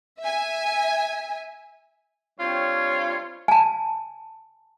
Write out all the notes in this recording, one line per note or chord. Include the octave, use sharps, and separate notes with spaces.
E5 G#5
G3 C4 D4 F4 C#5
G#5 A5